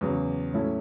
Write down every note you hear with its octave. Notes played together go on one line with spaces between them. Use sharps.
E2 C#3 F#3
A2 F#3 C#4 E4 A4